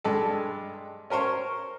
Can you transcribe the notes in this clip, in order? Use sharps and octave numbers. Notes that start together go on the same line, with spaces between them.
G2 G#3 A4
C#4 A#4 C5 C#5